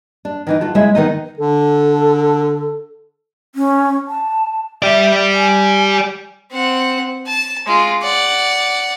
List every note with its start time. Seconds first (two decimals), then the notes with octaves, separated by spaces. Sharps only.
0.25 D4
0.47 D#3 E3 D#4
0.61 F4 F#4 A4
0.75 C#3 G#3 E4 E5
0.95 D#3 B3 D#4 D#5
1.38 D3 A4
3.55 C#4
4.07 A5
4.82 G4 D5 E5
5.34 G#5
6.52 C4 F#5
7.26 A5
7.66 G#3 F4
8.02 D5 F#5